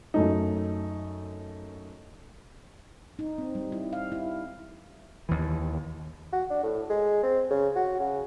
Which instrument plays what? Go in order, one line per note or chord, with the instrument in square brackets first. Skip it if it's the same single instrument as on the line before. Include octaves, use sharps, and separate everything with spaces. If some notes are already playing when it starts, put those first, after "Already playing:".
[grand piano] F#2 A3 D#4
[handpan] D#4
C4
G3
E4
F5
E4
[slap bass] D#2 E3
[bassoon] F#4
D4
A2
G#3
C4
C#3
F#4
C#3